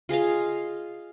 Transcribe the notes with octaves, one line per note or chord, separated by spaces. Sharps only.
F4 G#4 D#5 F5